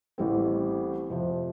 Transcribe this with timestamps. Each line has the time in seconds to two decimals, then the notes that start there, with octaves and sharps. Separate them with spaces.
0.18 A1 A2 G3 C4
1.10 F2 C3 F3